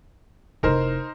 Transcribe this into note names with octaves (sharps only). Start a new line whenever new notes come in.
F1 D#4 E4 A#4 C5